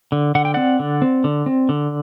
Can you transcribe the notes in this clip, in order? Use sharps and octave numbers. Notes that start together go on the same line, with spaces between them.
D3
D3 F#5
G5
C4 D5 F#5
D3
C4
D3
C4
D3